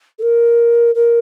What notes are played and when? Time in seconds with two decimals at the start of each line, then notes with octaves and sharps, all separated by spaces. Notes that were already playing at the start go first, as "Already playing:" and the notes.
0.19 A4
0.22 A#4
0.95 A#4